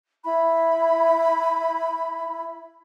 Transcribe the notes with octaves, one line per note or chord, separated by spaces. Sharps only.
E4 B5